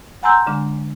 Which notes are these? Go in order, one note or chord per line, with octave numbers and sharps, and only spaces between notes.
F#5 G#5 A#5 C6 E6 G6
D3 G#3 D4